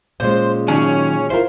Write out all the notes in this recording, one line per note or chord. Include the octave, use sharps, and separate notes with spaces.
A#2 C#3 G#3 C5
D#3 F#3 C#4 G#4
E4 F4 A#4 C5